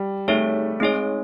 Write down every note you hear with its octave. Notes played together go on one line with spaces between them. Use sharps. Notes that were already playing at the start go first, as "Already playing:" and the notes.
Already playing: G3
A3 C4 D#4 G#4 C#5
G#3 C4 D#4 G#4 C#5